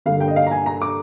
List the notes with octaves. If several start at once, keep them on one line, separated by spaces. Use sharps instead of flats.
G2 D3 G3 A#3 F5
G5
D#5
F5
A#5
G#5
A#5
D6